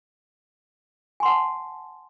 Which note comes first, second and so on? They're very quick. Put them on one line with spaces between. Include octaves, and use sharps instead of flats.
G#5 C6 F#5 A5